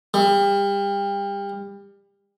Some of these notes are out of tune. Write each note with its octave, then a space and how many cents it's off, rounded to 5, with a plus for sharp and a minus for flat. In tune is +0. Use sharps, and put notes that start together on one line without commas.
G3 +30